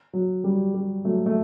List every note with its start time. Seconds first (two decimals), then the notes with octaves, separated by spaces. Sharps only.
0.13 F#3
0.44 G3
0.74 G3
1.05 F#3 A3
1.26 A3